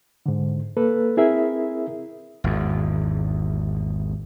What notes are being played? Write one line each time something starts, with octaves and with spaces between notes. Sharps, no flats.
G#2 D3
A#3 A4 B4
C4 E4 G#4 A#4 E5
G#1 E2